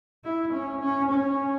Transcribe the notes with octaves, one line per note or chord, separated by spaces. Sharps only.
E4
C#4
C#4
C#4